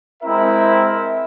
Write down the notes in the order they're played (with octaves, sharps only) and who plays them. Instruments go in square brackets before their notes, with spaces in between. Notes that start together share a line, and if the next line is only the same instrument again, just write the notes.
[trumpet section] G#3 C4 E4 A#4 E5